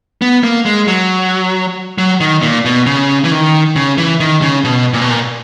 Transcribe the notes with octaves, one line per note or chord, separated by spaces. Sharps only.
B3
A#3
G#3
F#3
F#3
D#3
A#2
B2
C#3
E3
D#3
C#3
E3
D#3
C#3
B2
A#2
B2
A#2